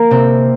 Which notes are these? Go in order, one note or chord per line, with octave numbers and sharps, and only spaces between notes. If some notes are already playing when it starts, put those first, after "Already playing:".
Already playing: A#3
C3 C4